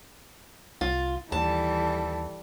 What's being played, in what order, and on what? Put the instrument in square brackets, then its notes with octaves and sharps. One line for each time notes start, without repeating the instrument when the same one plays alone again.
[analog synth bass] C2 [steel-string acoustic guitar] F4
[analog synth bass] D#2 [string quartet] E3 G3 A4 [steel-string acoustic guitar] A5